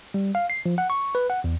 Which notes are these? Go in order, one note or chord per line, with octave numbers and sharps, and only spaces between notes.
G3
F5
C7
F3
F#5
C#6
B4
F#5
E2